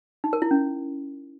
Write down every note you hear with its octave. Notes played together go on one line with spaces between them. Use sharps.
D#4
A#4
E4
C#4